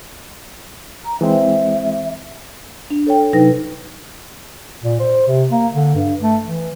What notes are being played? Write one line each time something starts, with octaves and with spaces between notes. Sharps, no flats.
A#5
E3 G#3 C4 E5
D4
A4 C#5 G5
C3 F#3 D#4 B4 G5 A#6
A#2
C5
C3
A#3
D3
G2
A3
E3